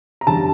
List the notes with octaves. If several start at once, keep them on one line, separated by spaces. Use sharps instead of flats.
A#5
F#2 D3 G3 A5